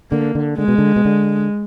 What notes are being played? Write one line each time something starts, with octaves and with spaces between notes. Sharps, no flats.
D3 A#3
D3
D3 G#3
B2
D3
B2
D3